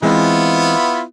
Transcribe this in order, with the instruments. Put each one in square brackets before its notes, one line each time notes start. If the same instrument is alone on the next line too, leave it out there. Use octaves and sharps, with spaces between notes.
[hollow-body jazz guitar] E3 G#3 C4 [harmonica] B3 E4 F4